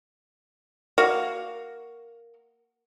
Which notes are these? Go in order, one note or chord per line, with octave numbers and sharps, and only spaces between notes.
A#3 F#4 F5